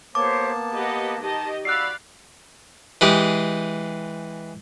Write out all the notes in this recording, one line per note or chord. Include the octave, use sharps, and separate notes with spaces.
A#3 B3 G4 C5 C#5 A5 D6
G4 B4 D#5 F#5
D#3 G4 D#5 A5
F#4 D5 F5 B5 E6 F#6 C7
E3 G#3 G4 G#4